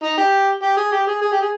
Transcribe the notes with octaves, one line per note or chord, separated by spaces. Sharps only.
D#4
G4
G4
G#4
G4
G#4
G#4
G4
G#4